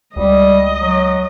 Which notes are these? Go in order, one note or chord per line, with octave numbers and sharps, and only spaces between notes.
C#2 G3 D#5
F#3